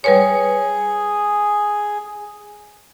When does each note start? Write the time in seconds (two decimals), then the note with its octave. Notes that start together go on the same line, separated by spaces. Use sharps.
0.04 G3 G#4 B4 C#5